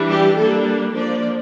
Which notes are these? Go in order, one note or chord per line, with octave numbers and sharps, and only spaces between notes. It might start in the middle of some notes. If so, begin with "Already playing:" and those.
Already playing: E3 G3 D4
G4
G3 A#3 D4 A4
F3 A#3 D4 D5